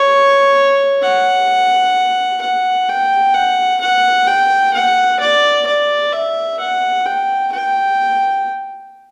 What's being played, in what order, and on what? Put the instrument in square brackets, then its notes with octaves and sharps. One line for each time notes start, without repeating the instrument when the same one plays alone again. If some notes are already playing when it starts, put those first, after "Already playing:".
Already playing: [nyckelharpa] C#5
F#5
F#5
G5
F#5
F#5
G5
F#5
D5
D5
E5
F#5
G5
G5